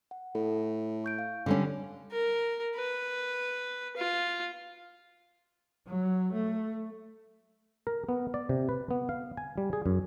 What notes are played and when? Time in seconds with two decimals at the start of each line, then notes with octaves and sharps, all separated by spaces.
0.11 F#5
0.35 A2 A4
1.04 C#6 G6 D7
1.19 F5
1.46 D3 G3 C#4
2.11 A#4
2.76 B4
3.97 F4
5.88 F#3
6.33 A3
7.87 A#4
8.09 B3
8.34 D5
8.49 C3
8.69 B4
8.91 B3
9.09 F5
9.37 G#5
9.58 G3
9.73 G#4
9.86 F#2